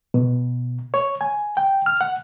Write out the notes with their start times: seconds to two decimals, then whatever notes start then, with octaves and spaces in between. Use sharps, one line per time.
0.14 B2
0.94 C#5
1.21 G#5
1.57 G5
1.86 F6
2.01 F#5